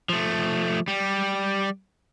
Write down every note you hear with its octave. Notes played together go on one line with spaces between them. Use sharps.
F3 A3
G3